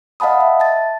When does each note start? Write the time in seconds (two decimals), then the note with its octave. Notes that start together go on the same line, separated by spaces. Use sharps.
0.20 D#5 F5 F#5 A5 B5 D#6
0.40 E5
0.60 A5 A6